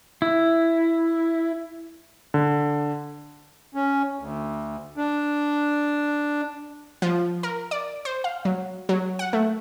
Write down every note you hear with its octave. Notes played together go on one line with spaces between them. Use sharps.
E4
D3
C#4
D2
D4
F3
A#4
D5
C5
F5
F#3
F#3
F#5
A3